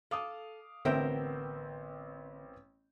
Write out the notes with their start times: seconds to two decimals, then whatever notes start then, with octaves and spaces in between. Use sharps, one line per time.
0.11 A4 F5 D6 D#6
0.85 A1 D3 B3 C4 A#4 E5 G5 G6